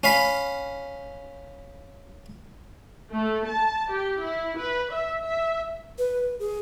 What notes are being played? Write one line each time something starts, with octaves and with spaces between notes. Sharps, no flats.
C#4 F5 B5
A3
A5
G4
E4
B4
E5
E5
B4
G#4